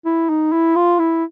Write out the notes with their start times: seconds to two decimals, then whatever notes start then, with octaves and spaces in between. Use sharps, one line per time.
0.05 E4
0.29 D#4
0.52 E4
0.76 F4
0.99 E4